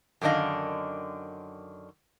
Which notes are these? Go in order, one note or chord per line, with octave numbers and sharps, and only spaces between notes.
F#2 D3 D#3 D4 D#5 F5